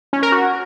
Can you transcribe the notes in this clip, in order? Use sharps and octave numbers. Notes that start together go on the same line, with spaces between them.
C#4
A#4
F#4